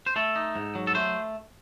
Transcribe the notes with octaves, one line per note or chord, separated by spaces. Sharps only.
C5
A3 A4
D#4
G#2
F#3
A4
A3 C5